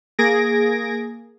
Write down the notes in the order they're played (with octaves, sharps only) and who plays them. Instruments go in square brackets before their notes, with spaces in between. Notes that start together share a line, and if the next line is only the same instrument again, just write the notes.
[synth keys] A#3 G#4 G#6 A#6 D7